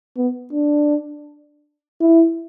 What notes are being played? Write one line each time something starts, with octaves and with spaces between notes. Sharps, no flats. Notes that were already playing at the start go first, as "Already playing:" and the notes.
B3
D4
E4